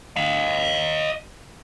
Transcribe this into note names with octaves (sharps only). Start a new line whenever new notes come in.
D#5 F5